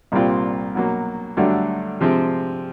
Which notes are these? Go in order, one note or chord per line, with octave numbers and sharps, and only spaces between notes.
C2 A#2 G3 C4 F4
B2 F#3 A#3
G2 D3 F#3 A3 D4
C3 F3 G#3 C4